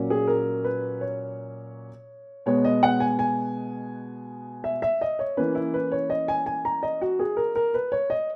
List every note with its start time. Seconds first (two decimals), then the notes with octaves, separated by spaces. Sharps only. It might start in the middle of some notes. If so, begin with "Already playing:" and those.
Already playing: A#2 F#3 A#3 C#4
0.10 G#4
0.27 A#4
0.64 B4
1.01 C#5
2.46 B2 G#3 B3 C#5
2.65 D#5
2.83 F#5
3.00 G#5
3.19 G#5
4.64 E5
4.82 E5
5.01 D#5
5.19 C#5
5.37 E3 A#3 C#4 B4
5.55 E4
5.74 B4
5.92 C#5
6.10 D#5
6.28 G#5
6.46 G#5
6.65 A#5
6.83 D#5
7.01 F#4
7.19 G#4
7.37 A#4
7.55 A#4
7.74 B4
7.92 C#5
8.10 D#5